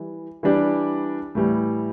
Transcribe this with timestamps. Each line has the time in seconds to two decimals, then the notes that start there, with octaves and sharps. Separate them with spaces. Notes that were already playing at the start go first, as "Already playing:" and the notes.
Already playing: E3 G3
0.43 E3 G3 D4 G4 D5
1.35 A2 E3 G3